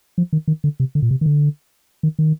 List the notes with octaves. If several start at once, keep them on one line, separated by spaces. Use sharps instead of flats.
F3
D#3
D#3
D3
C3
D3
A#2
C3
D#3
D3
D#3
D#3